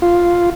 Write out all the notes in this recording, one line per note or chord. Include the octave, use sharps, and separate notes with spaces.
F4